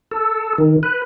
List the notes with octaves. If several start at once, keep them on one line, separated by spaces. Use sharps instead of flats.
A4
D#3
B4